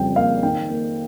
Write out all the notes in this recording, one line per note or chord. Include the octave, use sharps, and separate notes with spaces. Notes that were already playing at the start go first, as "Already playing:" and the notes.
Already playing: F2 C#3 G3 G5
A#3 F5
D#3 G5
A#3